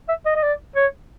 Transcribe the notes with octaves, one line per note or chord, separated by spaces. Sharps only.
E5
D#5
D#5
D5
C#5